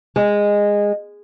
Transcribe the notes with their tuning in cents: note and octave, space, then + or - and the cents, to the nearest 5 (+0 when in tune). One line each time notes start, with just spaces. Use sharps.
G#3 -15